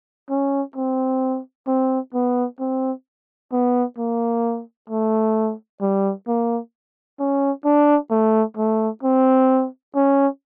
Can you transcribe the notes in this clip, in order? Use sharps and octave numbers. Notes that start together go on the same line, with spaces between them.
C#4
C4
C4
B3
C4
B3
A#3
A3
G3
A#3
C#4
D4
A3
A3
C4
C#4